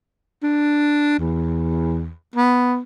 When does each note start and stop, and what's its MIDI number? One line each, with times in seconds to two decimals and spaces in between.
0.43 1.16 62
1.19 2.11 40
2.36 2.80 59